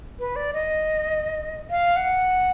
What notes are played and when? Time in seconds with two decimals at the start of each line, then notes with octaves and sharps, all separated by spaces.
0.19 B4
0.36 D5
0.53 D#5
1.70 F5
1.96 F#5